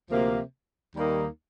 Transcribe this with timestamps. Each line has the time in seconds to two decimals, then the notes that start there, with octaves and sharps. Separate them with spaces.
0.10 D2 C3 F3 A#3
0.95 D#2 D#3 G3 A#3 D#4